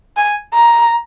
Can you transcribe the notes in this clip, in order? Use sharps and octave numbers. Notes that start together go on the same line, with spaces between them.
G#5
A#5